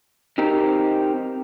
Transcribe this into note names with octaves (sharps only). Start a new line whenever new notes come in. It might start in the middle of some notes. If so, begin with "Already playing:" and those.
C4 D#4 G4 A#4